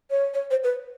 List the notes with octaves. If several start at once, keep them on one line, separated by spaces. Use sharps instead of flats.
C#5
C#5
C5
B4